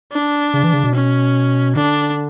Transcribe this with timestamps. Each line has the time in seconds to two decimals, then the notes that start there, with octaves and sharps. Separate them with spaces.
0.12 D4
0.54 C#3
0.64 E3
0.73 C#3
0.84 B2
0.94 C#4
1.75 D3 D4